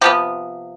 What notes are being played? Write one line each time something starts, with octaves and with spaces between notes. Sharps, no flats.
C3 F3 B3 G4